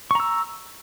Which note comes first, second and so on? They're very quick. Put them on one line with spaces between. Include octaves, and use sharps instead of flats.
C#6 A#5 E6